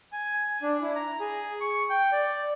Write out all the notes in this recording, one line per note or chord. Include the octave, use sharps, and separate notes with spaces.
G#5
D4
E4
A#5
G#4
C#6
G5
D5